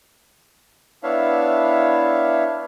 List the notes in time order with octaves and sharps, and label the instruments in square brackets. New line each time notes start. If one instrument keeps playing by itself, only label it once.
[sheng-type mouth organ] B3 D4 E4 C#5 E5 F5